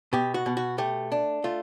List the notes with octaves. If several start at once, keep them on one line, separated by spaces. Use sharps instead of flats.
B2 G4
F#4
B2
F#4
A3 G4
D4
A3 F4